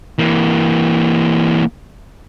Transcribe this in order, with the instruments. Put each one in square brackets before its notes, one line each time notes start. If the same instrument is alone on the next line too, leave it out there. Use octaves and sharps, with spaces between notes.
[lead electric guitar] E3 A#3